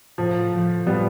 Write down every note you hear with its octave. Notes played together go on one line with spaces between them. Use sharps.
A2 F3
F3 A3
A2 G3 B3